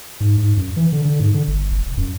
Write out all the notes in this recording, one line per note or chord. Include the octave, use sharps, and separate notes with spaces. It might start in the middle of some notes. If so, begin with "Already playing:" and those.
G#2
G#2
F#2
E3
D3
D3
G#2
D3
G1
F#1
E1
F#2